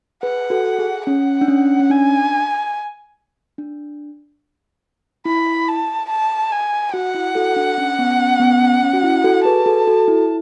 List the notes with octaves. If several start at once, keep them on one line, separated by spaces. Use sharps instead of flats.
G#4 B4 F#5
F#4 A4
G#4
C#4 F#5
D4
C#4
C#4
D4 G#5
D4
E4 B5
A5
A5
G#5
F#4 F#5
E4
F#4 A4
D4
C#4
B3
C#4
B3
C#4
C#4
F#4
E4
F#4 A4
G#4 B4 A5
F#4 A4
F#4 A4
E4